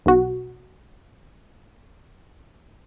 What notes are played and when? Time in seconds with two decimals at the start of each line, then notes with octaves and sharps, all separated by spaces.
0.06 B1 F#4